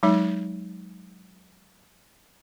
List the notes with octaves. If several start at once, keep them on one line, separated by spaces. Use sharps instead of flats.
F#3 G#3 D#4